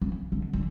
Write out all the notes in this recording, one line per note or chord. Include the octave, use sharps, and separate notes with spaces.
C#3
D3
D3